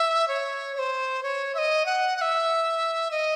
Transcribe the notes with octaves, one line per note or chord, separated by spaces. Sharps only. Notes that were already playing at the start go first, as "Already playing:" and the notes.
Already playing: E5
C#5
C#5
C5
C#5
E5
D#5
F#5
F#5
E5
D#5